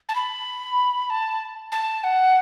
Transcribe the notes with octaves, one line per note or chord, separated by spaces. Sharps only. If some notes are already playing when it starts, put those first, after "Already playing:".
A5
B5
A5
A5
F#5